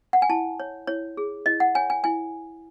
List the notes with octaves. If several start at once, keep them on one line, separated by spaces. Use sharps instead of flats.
F#5
G#5
E4 A5
C#5
E4 C#5
G#4
E4 D#5
F#5
C#5 G#5
G#5
E4 G#5